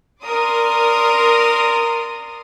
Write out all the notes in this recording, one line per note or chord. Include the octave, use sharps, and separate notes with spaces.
A#4 D5 C6 D#6